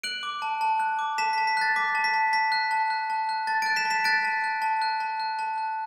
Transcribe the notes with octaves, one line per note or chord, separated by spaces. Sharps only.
F#6 D7 F#7
D6
A5
A5
F#6
D6
A5 B6 E7
A5 B6
B6
F#6 A6
D6 B6
A5
B6
A5
A5 B6
F#6
A5
F#6
A5
F#6
A5 A6
F#6 A6 D7
B6 E7
A5
B6 E7
F#6 A6 D7
A5
F#6
A5
F#6
A5
F#6
A5
F#6